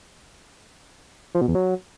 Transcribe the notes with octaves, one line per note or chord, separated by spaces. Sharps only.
F3
B2
E2
F#3